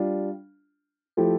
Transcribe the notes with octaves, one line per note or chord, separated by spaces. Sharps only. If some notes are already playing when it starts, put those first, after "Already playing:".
Already playing: G3 D4 F4
F3 A3 E4 G4